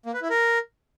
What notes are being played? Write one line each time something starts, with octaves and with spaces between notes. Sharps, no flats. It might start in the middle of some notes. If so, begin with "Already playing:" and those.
A#3
B4
E4
A#4